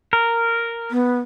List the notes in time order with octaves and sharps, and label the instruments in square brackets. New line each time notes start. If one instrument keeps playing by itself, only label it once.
[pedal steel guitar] A#4
[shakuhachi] B3